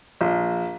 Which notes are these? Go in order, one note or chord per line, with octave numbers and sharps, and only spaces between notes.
A#1